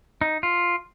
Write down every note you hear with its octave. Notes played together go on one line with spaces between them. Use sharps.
D#4
F4